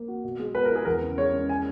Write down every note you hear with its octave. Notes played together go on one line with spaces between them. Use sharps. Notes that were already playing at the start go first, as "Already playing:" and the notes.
Already playing: A#3
F#4
B2
G#3
B3 B4
A#4
E4 G#4
E2 A#4
C#3
G#3 C#5
C#4
G#5